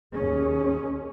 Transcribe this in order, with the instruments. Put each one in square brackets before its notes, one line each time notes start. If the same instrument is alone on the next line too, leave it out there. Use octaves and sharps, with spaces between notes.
[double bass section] D#2 C#4 [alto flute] G#4